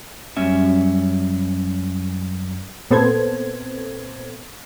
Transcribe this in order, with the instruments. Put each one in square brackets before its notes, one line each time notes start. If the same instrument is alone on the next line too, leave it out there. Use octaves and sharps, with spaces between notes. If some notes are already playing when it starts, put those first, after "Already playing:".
[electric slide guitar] F#2 G3 C#4 E5
[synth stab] A#2 B3 C4 A4 C5 G#6